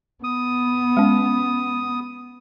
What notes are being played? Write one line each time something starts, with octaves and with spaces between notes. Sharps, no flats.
B3 D#6
G#3 C#4